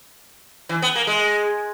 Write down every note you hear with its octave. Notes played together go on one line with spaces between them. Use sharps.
E3
B3
A#3
G#3